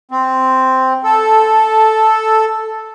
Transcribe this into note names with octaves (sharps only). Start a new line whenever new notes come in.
C4
A4